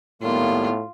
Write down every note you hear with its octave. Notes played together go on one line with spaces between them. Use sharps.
A2 D#3 G3 A#3 B3 F4